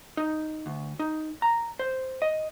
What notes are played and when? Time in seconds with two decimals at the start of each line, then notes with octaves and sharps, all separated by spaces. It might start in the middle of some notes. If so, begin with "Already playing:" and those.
0.17 D#4
0.66 D2
0.99 D#4
1.42 A#5
1.79 C5
2.22 D#5